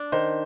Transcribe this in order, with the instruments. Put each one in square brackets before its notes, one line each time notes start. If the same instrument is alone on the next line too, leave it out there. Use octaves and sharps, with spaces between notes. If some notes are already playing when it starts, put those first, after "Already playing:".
Already playing: [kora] D4
[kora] D#3 [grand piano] C5